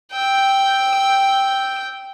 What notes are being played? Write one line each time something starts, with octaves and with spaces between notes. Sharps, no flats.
G5 E6